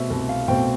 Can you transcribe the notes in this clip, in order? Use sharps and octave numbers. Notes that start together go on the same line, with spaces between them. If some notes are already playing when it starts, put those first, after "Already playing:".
Already playing: B2 A3 C4 E5
C2
F5
B2 A3 C4 G5